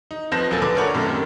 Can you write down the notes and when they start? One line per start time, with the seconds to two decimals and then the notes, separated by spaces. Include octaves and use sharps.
0.11 D#4
0.32 F2 F3 B4 G6 A#6 E7
0.51 D#1 F#3 A#3 A4 G#5 A6
0.62 D3 B4 D6
0.75 D4 A4 A#4 C#5 F#5 A5
0.94 F#2 A2 C3 D#3